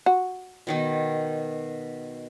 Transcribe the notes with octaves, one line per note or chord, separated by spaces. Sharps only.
F#4
B2 D#3 D#4